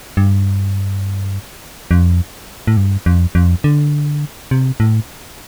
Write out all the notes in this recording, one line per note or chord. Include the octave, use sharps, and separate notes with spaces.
G2
F2
A2
G2
F2
F2
D3
C3
A2